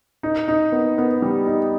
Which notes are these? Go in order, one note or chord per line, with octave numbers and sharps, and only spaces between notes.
D#4
D#4
B3
B3
G3
D#4